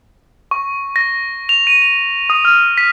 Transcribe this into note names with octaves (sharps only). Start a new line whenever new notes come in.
C#6
A#6
F7
D#7
F7
D#6
F6
B6